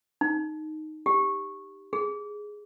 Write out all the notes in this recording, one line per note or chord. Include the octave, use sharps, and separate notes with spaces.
D#4
G4
G#4